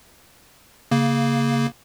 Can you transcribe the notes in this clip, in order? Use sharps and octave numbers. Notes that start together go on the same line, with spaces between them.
C#3 A#3